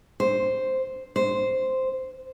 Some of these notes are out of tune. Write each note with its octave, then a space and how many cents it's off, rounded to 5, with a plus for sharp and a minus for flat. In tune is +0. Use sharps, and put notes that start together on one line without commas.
C5 +0
C5 -5